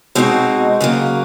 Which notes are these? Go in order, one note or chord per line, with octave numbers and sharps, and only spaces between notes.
B2 G#3 C4 D#4 F#4
C#3 F#3 A#3